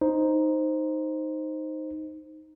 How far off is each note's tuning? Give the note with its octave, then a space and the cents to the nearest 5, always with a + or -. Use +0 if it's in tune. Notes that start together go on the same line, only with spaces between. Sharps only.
D#4 +0 C5 +0